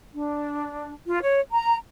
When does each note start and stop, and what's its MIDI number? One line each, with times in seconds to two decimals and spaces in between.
0.14 0.92 62
1.07 1.22 65
1.22 1.40 73
1.52 1.76 82